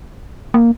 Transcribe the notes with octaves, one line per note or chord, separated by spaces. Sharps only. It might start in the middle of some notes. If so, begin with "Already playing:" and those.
A#3